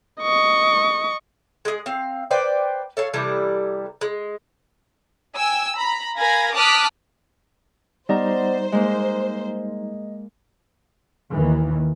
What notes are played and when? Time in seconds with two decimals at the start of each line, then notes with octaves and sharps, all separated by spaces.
0.21 D#5 C#6
1.65 G#3 G#4
1.86 C4 F5
2.31 B4 C5 D5 G5
2.97 A4 C#5 F5
3.13 C3 E3 G3 A4
4.01 G#3
5.35 G5 G#5 E6
5.75 A#5 B5
6.18 A#4 F5 G#5 B5 G#6 A#6
6.53 A5 D6 D#6 F6 F#6 B6
8.09 G3 B3 D#4 C5 D5 D#5 A#5
8.72 G#3 A#3 D#5
11.33 D#2 D#3 E3